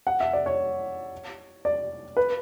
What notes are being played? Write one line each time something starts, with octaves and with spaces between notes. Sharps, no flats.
F#5
E5
D5
C#5
D5
B4